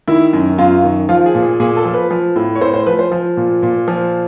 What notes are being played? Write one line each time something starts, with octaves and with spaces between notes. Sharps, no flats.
D#3 E4
F#2
F#2 F4
D#3
F3 F4
G#4
A#2
G#4
A#2 G#4
A4
F3
B4
F3
A2
C#5
A2 C5
C5
F3 B4
C5
F3
A#2
A#2
F3